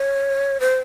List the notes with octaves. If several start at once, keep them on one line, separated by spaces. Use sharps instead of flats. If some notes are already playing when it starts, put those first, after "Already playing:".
Already playing: C#5
C5